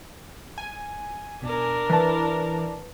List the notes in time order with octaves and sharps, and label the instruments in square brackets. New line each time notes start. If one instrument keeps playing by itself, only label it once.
[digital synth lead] G#5
[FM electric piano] B2 [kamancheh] D4 A#4
[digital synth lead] E3 [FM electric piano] B4 D5 A5